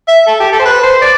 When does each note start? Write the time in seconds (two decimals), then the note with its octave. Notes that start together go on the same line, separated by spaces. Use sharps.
0.08 E5
0.27 A4
0.40 G4
0.52 A4
0.59 C5
0.65 B4
0.83 C5
1.02 D5